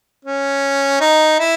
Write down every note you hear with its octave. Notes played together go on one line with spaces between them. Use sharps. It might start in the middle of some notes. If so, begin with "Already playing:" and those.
C#4
D#4
E4